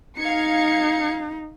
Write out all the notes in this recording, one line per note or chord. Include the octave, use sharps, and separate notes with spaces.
D#4 F5 G#6 C#7